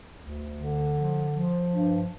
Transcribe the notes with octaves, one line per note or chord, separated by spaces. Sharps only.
D2
D3
F3
F3
G2